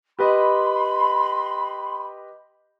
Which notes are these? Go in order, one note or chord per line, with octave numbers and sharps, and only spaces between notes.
G4 B4 D#5 B5 C6